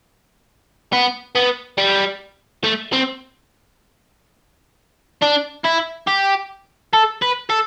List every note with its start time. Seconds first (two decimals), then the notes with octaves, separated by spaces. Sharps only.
0.93 B3
1.35 B3
1.78 G3
2.64 A3
2.92 C4
5.22 D4
5.64 E4
6.07 G4
6.93 A4
7.22 B4
7.50 A4